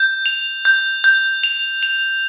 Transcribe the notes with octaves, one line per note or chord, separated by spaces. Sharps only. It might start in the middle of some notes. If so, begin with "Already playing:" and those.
Already playing: G6
F7
G6
G6
F7
F7